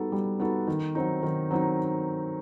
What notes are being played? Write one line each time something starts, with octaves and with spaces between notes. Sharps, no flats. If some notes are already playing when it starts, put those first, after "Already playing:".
Already playing: G3 B3 D#4 F#4 A4
G3
B3 D#4 F#4 A4
D#3
F#3 C4 D#4
D#3
F#3 C4 D#4